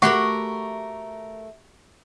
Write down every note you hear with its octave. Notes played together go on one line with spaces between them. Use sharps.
A3 F#4 G4 A#4 F#5 B5 C#6